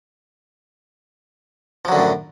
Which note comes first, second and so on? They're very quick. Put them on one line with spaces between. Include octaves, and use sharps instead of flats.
F3 F#3 D3 F#2 A2